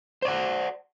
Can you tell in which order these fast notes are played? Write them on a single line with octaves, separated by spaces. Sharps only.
C5 D5 F#5